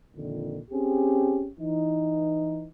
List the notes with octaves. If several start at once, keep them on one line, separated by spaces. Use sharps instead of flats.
F2 A#2 D3 D#3
C4 C#4 G4 G#4
E3 D#4